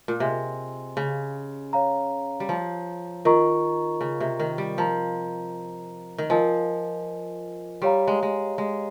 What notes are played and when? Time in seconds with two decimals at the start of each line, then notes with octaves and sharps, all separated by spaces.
0.08 A#2
0.20 C3 G#4 D#5 G#5 C6
0.97 C#3
1.73 C#5 F5 A#5
2.40 G3
2.49 F3
3.25 D#3 F4 A#4 D#5 A#5 C#6
4.01 C#3
4.20 C3
4.39 D#3
4.58 G3
4.77 F3 A#4 D#5 A#5
6.18 D#3
6.30 F3 F4 A#4 D#5 G#5
7.82 G3 G4 C#5 F5 A#5
8.08 G#3
8.23 G#3
8.58 G#3